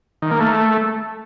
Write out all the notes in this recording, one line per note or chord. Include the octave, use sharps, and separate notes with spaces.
D#3
A#3
A3